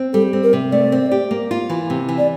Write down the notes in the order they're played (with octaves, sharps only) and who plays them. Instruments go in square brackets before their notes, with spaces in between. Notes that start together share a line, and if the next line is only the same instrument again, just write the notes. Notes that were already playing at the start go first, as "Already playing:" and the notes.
Already playing: [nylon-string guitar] C4
[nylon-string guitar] G3 [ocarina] A4
[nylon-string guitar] C4
[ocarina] A#4
[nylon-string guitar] C3
[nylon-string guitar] A3 [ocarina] D5
[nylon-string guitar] C4
G4
A#3
F4
E3
C3
E3
[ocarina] D5